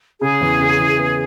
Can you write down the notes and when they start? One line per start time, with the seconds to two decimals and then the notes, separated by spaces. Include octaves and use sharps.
0.21 C#3 G#4
0.41 E2
0.60 C#3
0.80 E3
0.98 B3